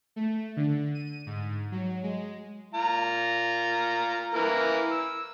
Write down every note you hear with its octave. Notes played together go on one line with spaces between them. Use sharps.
A3
D3
D#7
G#2
F#3
G#3
F4 A#5
E3 A#3 A#4
E6